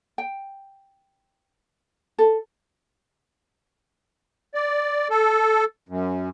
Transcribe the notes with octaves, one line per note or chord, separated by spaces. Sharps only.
G5
A4
D5
A4
F#2